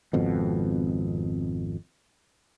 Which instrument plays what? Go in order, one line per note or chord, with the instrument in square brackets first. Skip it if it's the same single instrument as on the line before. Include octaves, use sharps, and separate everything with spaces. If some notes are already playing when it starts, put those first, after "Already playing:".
[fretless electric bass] G#1 F2 B2